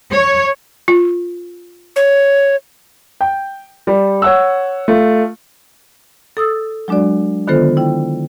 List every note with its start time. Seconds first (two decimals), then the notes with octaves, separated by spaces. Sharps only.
0.12 C#5
0.88 F4
1.96 C#5
3.21 G5
3.87 G3
4.22 C#5 F#5 E6
4.88 A3 F4
6.37 A4 D#6 E6 A6
6.88 F#3 G#3 D4 F#4 D5
7.47 D3 D#3 B3 F4 A4 C5
7.77 E4 G5